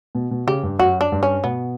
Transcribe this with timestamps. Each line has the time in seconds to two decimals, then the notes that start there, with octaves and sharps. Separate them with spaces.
0.15 B2
0.31 B2
0.47 C#3 G4
0.63 G2
0.79 F#2 F#4
1.01 D4
1.12 G2
1.23 C#4
1.44 B2 B3